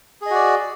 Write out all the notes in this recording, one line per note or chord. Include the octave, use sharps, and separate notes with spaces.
F#4 G#4 D5 D#5